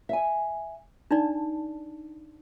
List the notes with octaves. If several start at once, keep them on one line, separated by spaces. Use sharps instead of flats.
E5 G#5
D4 D#4 D5 A5